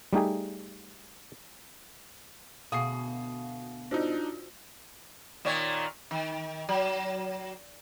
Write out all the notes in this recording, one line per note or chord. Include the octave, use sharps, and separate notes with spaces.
G3 A3 D#4 G4 G#4
D2 B2 G#4 F5 D#6 C7
D4 D#4 F4 F#4 C5
A#2 D#3 C#5
D#3
F#3